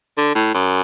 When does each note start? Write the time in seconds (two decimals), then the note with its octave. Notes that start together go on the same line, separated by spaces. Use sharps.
0.18 D3
0.35 A2
0.54 F#2